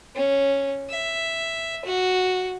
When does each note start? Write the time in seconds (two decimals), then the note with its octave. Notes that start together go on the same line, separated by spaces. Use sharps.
0.15 C#4
0.90 E5
1.85 F#4